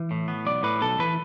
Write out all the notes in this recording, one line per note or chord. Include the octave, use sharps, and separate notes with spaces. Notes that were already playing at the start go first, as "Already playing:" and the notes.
Already playing: E3
A2
B3
B1 D5
A2 B4
B1 A4
E3 B4